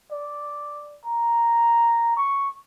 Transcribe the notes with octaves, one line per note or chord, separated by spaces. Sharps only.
D5
A#5
C#6